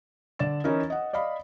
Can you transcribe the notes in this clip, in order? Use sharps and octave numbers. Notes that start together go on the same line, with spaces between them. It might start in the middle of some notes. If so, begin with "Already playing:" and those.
D3 D5 A6 E7
E3 C#4 D#4 E4 A#4
D#5 F#5
D5 D#5 F5 B5